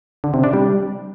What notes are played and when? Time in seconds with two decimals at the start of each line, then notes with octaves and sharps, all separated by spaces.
0.24 D3
0.34 C3
0.44 D4
0.53 G3